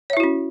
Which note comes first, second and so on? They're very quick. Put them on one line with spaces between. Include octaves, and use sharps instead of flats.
C#5 E5 E4 F#4 C#4